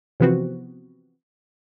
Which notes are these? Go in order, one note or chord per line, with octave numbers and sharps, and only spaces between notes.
C3 E3 F3 B3 C4 F#4